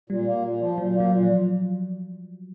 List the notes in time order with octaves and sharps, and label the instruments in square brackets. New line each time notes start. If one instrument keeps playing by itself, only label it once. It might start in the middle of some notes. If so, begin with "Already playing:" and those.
[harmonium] A#2 [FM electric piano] G3
[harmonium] A#3
A#2
F3
[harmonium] A#2 [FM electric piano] F#3
[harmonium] A#3
[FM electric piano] F#3
[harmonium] A#2
[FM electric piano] F3